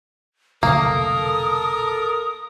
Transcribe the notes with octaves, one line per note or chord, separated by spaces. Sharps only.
F1 B1 D3 A#3 A4 A#4 D#6